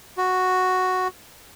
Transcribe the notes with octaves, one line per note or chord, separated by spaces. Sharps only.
F#4